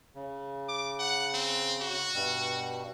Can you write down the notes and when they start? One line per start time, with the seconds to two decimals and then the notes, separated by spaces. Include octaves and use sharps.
0.15 C#3
0.68 D6
0.99 F#5
1.34 C4
1.81 F#4
2.14 G2 B2 G3